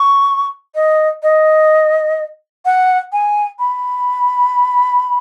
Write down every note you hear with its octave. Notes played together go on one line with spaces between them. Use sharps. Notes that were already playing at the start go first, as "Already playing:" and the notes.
Already playing: C#6
D#5
D#5
F#5
G#5
B5